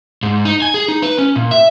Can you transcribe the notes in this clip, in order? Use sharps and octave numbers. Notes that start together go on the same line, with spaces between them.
G#2
D#4
G#5
G#4
D#4
B4
C#4
A#2
E5